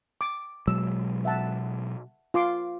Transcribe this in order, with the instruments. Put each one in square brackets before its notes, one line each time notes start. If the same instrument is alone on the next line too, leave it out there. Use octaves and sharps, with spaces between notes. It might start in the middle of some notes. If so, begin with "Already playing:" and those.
[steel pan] D6
[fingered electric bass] B2 F#3 G#3 [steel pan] E6
[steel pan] E5 F#5 A5
F4 C6 D6